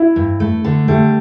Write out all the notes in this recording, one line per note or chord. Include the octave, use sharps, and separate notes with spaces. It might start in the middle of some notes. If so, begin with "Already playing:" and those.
Already playing: E4
G2
A3
D3
G3 A3